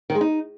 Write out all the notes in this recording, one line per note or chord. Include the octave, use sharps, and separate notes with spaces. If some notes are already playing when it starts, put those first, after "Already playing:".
D#3
G#3
D#4